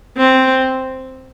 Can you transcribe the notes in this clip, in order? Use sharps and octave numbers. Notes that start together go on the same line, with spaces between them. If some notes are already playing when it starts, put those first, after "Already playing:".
C4